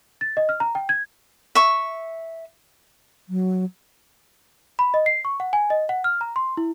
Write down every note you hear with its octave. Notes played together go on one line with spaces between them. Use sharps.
A6
D#5
F6
A#5
G5
G#6
E5 C#6
F#3
B5
D#5
C7
C#6
F#5
G#5
D#5
F#5
F6
A#5
C6
E4